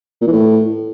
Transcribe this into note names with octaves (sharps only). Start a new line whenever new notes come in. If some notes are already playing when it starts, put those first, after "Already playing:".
A#2
E3
A2